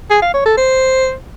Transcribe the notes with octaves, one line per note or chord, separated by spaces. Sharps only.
G#4
F5
C#5
A4
C5